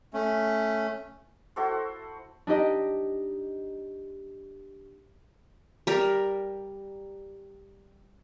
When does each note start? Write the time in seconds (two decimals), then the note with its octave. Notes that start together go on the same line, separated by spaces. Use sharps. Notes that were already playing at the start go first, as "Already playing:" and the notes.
0.14 A3 C#4
1.56 E4 F#4 A4 C5
2.47 D4 D#4 G4 D#5
5.87 G3 A#4